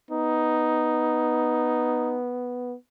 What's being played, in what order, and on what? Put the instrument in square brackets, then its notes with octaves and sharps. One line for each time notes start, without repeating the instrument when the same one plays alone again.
[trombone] B3 [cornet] D#4